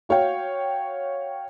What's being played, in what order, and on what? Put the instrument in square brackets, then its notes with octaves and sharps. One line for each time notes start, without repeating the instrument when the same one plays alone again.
[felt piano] F#4 C#5 F5 G5